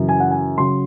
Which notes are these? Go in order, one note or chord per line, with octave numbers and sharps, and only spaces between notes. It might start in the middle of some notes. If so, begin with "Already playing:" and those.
Already playing: F#2 C#3 E3
G#5
F#5
G#5
C#3 F#3 C6